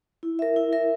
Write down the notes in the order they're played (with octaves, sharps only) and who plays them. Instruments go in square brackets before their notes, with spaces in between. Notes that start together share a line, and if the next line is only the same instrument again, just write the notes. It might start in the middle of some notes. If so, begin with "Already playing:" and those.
[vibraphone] E4
A#4 E5
E4
A#4 E5